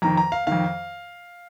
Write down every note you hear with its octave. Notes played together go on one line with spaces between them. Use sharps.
F2 D#3 A#5
A#5
F5
F2 D#3 F5